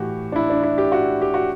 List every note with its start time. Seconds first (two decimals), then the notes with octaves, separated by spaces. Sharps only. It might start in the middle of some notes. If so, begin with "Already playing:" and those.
Already playing: A2 E3 F#4 G4
0.32 D4
0.36 E4
0.50 D4
0.63 E4
0.78 G4
0.92 F#4
1.22 G4
1.34 F#4